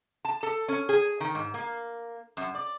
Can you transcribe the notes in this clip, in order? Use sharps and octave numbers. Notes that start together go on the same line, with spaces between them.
A5
A4
C#4
G#4
D#3
G#2
A#3
F#2
D5